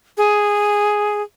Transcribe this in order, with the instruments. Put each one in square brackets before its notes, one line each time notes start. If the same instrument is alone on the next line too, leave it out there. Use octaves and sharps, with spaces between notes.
[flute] G#4